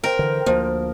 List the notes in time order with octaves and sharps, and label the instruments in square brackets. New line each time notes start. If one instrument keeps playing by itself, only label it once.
[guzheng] A#4 [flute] C5 [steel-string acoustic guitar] G5
[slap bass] D3 E3
[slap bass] D2 A#3 [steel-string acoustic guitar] F3